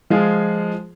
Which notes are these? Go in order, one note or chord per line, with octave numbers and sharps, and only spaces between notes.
F3 G#3 F4 G#4